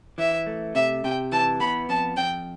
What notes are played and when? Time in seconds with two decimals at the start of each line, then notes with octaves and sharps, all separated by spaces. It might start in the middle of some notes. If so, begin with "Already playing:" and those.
0.18 E3 E5
0.47 A3
0.75 C3 E5
1.04 C3 G5
1.32 E3 A5
1.60 B3 B5
1.89 F2 A5
2.17 F2 G5